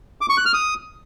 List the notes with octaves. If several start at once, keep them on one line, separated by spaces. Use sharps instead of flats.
D6
C#6
F#6
F6
D#6